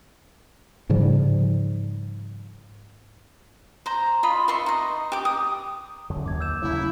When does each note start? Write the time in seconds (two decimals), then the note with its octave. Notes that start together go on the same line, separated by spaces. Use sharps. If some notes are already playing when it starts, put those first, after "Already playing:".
0.89 G#2 C#3 F3 G3
3.86 C5 A#5
4.23 F4 D#5 B5
4.48 E5 C6 C#6
4.66 D#4 D#5
5.12 G4 D6
5.25 D#6
6.10 F#2 D3 F#3
6.26 D#2 D6 G#6
6.40 E6 G6 E7
6.62 C#3 F#3 A3 E4